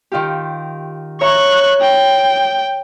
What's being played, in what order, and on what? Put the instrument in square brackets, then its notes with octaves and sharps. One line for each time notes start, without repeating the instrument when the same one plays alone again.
[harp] D#3 F4 G4
[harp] C#5 E5 A#5 [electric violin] C#6 F#6
[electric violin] G5